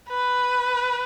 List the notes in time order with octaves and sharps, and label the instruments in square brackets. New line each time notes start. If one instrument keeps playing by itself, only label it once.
[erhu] B4